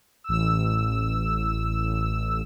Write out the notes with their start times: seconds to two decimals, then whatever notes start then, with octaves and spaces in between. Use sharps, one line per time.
0.24 A1 E6